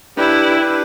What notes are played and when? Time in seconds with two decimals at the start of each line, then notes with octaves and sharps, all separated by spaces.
0.17 D4 E4 G4 B4
0.57 D4 G4 B4